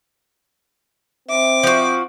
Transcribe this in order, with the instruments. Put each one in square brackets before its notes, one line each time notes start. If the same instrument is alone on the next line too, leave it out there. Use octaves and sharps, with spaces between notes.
[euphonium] C4 [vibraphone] E5 [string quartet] D6
[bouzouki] F3 F#4